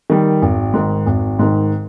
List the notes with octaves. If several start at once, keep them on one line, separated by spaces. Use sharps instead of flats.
D#3 G3
G#1
G#2 D#3
G#1
G#2 D#3